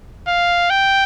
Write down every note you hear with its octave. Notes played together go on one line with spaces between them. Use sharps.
F5
G5